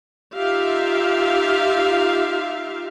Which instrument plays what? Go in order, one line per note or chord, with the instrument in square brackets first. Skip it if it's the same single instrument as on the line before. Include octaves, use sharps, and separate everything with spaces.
[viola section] D#4 F4 G4 E5 F5